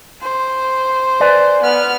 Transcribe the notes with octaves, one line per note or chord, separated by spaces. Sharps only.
C5
B4 D5 G#5
B3 F6